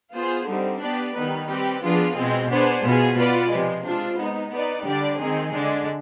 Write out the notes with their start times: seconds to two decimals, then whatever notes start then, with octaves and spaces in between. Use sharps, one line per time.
0.14 B3 F4 G#4 C5
0.47 D3 G3 C4 D#4
0.81 B3 D4 G4 B4 D5
1.14 D#3 G3 B3 D#4 B4
1.48 G3 C4 G4 B4
1.82 F3 B3 D4 F4 G#4
2.16 B2 G#3 C4
2.49 B3 D4 G#4 C5
2.83 B2 B3 F4 G#4
3.17 B3 F4 B4 D5
3.50 C3 F3 G#3
3.83 G#3 D4 F4 C5
4.17 G#3 B3 D#4
4.51 B3 D#4 B4 D5
4.84 D3 G3 D4 G4 D5
5.18 D#3 G#3 C4 D#4 G#4
5.52 D3 G#3 D4